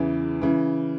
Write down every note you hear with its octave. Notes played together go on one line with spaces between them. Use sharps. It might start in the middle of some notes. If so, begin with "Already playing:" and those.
Already playing: E2 C#3 E3
C#3 E3